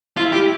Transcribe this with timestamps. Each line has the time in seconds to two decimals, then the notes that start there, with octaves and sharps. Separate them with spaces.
0.17 E4 F4
0.33 G4